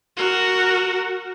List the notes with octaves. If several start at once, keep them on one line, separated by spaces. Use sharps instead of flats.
F#4 A#4